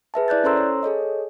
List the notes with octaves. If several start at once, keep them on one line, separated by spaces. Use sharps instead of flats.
G#4 B4 E5 A5
E4 D5 F#6 G6 A6
C#4 A4 C5 A#5 C6 E6
C#5
G#4 A4 C#5 D#5